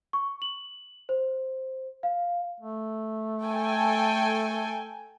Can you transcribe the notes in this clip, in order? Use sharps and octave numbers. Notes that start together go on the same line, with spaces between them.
C#6
F#7
C5
F5
A3
A4 G5 G#5